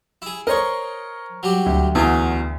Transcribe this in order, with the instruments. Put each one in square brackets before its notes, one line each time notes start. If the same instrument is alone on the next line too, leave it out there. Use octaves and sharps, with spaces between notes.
[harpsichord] E4 G#4
[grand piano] A#4 C5 C#5 [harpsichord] D#5 C6 C#6
[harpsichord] F#3 G3 G4
[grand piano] D2
[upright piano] E2 [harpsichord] F4 F#4